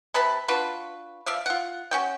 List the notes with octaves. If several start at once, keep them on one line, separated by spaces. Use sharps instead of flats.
C3 B4 A5 B5
D4 F4 F#4 B4
F3 D5 E5 F5
F4 F#5
C#4 F#4 G5